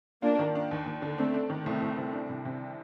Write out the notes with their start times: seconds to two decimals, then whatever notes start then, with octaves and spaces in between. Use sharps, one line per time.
0.22 A#3 D4 F4
0.39 D#3
0.55 D4
0.71 D#2
0.86 D#2
1.02 D3
1.18 A3 C4 D4
1.34 D4
1.50 D#3
1.66 C2 A3 C4
1.82 C2
1.98 C2
2.13 D4
2.29 C3
2.45 C3